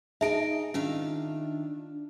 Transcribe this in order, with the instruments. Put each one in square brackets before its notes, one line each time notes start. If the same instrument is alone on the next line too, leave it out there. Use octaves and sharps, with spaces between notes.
[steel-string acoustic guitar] D#4 D#5 G#5 [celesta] G#4 A5 D7 [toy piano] E5
[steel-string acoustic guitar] D#3 F4 E5 [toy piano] C#4 [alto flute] D4